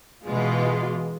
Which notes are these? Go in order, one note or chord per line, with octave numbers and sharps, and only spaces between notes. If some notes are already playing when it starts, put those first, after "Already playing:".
B2 E3 G#3 F4